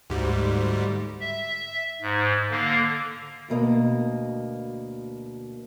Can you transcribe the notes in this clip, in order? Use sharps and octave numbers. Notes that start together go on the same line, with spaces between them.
D2 G#2 G3
E5
G#2
D3 A#3
D2 B2 A#3 D#5